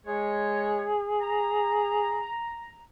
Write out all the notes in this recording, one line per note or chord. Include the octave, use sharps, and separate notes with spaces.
G#3 G#4 C#5
A#5